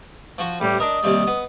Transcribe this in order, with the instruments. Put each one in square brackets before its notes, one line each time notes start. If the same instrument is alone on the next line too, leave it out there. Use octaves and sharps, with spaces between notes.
[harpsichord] F3 F#4
[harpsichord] A1 [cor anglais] G3
[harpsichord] D4 A#4 [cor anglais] D#5
[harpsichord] D#2 C3 G3
B3